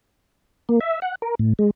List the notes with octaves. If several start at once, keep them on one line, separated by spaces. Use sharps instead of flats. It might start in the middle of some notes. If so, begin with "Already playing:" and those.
A#3
E5
F#5
A#4
A2
G#3